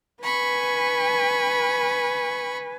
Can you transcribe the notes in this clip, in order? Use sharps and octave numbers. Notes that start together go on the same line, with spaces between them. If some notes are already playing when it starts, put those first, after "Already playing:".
B4 G#5 B5 C#6